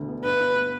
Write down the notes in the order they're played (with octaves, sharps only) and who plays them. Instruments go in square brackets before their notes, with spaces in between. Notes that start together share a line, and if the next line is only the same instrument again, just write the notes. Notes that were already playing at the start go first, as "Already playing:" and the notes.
Already playing: [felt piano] E1 D2 D3
B3
[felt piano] G2 [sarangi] B4
[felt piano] B3
B3